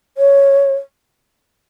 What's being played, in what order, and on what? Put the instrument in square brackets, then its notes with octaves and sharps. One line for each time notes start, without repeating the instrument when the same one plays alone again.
[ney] C#5